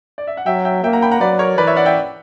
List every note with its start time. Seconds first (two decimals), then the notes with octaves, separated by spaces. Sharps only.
0.18 D5
0.27 E5
0.37 F#5
0.46 F#3 E5 G5
0.65 E5 G5
0.83 A#3 E5 G5
0.93 F#5 A#5
1.02 G5 B5
1.11 F#5 A#5
1.20 F#3 B4 D5
1.39 A#4 C#5
1.58 E3 B4 D5
1.67 C#5 E5
1.76 D5 F#5
1.86 E5 G5